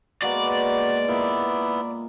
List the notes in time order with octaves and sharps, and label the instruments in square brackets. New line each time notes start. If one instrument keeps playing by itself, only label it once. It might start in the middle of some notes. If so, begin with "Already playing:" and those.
[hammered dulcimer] G#3 A#3 B3 [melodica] F#4 [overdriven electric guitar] D5
[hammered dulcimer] A#2 [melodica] B3 E4